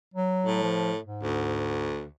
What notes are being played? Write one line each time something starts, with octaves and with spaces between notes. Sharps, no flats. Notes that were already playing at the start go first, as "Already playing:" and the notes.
F#3
A2
F3
G#2
D2